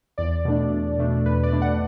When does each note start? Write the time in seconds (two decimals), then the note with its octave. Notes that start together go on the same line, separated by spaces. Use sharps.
0.18 E2 D5
0.45 B2 A3 D4
0.72 E2
0.98 B2 A3 D4
1.26 E2 B4
1.43 D5
1.52 B2 A3 D4
1.62 F#5